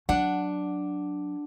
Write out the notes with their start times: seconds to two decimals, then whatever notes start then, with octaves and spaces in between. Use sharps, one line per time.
0.09 F#3 D4 F#5